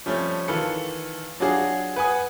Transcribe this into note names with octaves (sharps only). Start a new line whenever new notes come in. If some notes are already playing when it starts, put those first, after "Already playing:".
F3 G3 A3 C4 C#4
D#3 E3 F4 A4 B4 C#7
F#3 D4 F4 F#4 G#4
B4 F#5 G#5 D#6